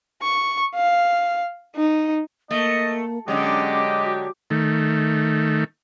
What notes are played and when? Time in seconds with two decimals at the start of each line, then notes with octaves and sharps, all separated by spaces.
0.22 C#6
0.75 F5
1.76 D#4
2.51 A3 A#3 D#5
3.28 D3 F#3 G#3 C#4 G4 D#5 D6
4.04 F#4
4.50 D#3 A3